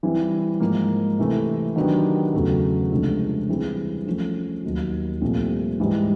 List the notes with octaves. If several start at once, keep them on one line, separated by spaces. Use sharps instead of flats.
E3 G3 C4 E4
G#2 F3 A#3
C3 E3 A3
D#3 F#3 B3 D4 G4
E2 C#3 F#3 A3
C#2 C3 F3 A3 D4
E3 G3 C4 E4 G#4
F3 A3 C#4
D#2 D#3 F#3
C2 A#2 F3 A3 C4
G#2 E3 G3